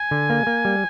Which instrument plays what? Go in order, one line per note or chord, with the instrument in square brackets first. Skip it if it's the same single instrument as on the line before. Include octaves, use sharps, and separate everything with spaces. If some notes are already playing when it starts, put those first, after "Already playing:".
Already playing: [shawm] G#5
[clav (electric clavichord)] D3
A#3
A#3
G3